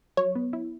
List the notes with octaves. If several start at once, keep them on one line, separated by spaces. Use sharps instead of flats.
F#3 C#5
B3
E4